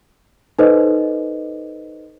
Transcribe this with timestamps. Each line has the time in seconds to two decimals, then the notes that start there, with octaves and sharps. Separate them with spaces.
0.59 D#4 A4 B4 C5 D#5